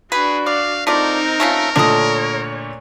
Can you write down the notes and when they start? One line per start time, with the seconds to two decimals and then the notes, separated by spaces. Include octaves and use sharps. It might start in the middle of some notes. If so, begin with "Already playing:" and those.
0.12 D4 F#4 G#4 B4
0.46 D5 F5
0.87 A3 C4 D#4 F4 A#4 D5
1.40 A3 C#4 F4
1.76 A#2 D3 A3 D4 A4 C#5 D#5